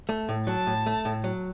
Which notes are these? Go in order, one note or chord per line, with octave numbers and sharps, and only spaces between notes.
A3
A2
F#3 A5
A2
A3
A2
F#3